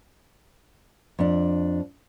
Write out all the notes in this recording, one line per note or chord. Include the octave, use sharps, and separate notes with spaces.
F2 D4